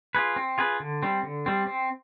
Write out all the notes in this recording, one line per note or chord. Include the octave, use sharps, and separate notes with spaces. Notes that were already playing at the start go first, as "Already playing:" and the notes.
F4 G#4 B4
C4
F4 G#4 B4
D3
G3 C4
D3
G3 C4
C4